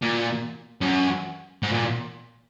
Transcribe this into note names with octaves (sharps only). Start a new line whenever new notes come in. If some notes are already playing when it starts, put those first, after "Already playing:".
A#2
F#2
G#2
A#2